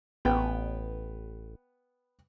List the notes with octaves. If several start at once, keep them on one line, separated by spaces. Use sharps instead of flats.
A1 B3 B4 G5